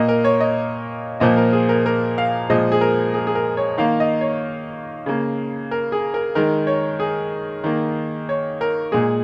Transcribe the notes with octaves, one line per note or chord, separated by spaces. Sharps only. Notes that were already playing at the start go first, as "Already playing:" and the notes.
Already playing: A#2 A#3 D#5
A#4
C#5
D#5
A#2 F3 A#3 D#5
A#4
G#4
A#4
A#4
F5
A#2 F3 G#3 D#5
G#4
A#4
G#4
G#4
A#4
C#5
D#3 A#3 F5
D#5
C#5
C#3 A#3
A#4
G#4
A#4
D#3 G#3 A#4
C#5
G#4
D#3 A#3
C#5
A#4
A#2 G#3 G#4